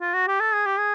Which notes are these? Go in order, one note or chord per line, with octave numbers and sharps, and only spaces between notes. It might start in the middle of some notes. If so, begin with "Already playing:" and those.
F4
F#4
G4
A4
G#4
G4
G#4